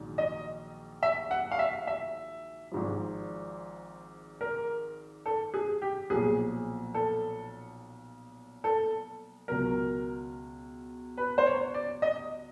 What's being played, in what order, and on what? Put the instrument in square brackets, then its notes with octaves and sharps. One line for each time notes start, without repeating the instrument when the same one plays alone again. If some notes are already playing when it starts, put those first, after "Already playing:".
Already playing: [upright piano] A#1 G#2 D#3 F#3
D#5
E5
F#5
F5
E5
E5
G#1 G#2 F3
A#4
A4
G#4
G4
B1 A#2 F3 G#4
A4
A4
C#2 B2 F#3 A#4
B4
C5
C#5
D5
D#5